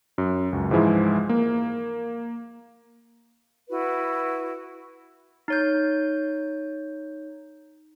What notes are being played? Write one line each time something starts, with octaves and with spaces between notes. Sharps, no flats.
F#2
C#2 F#2
G#2 E3 F3 G#3 E4
A#3
E4 F#4 B4
D#4 C#5 G6